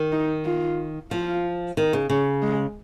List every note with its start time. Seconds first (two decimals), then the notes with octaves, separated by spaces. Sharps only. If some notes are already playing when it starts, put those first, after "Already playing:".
Already playing: D#3
0.12 D#4
0.45 F4
1.11 F3 F4
1.77 D#3 D#4
1.93 C#3
2.10 C#3 C#4
2.42 G#3